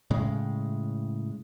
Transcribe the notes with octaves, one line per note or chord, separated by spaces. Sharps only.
A2 C#3 G#3